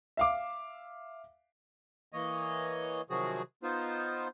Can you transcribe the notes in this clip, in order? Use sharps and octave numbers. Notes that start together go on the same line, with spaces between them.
E5 F5 D6
E3 A#3 C#5 D#5
C3 D#3 F3 F#3 F#4 G#4
B3 D#4 F4 C5